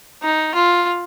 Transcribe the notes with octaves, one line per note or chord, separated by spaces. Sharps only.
D#4
F4